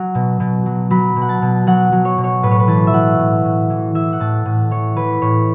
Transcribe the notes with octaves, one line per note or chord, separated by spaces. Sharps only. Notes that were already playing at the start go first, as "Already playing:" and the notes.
Already playing: F#3 F#5
B2
B2
F#3
F#3 B5
B2
F#5
A5
B2
F#3 F#5
F#3
C#5
B2
C#5
A2 B4
C#5
B4
E3 A5
E5
E3 F#5
A2
A2
E3
E3 E5
F#5
A2 A5
A2
E3 C#5
E3 B4
A2 C#5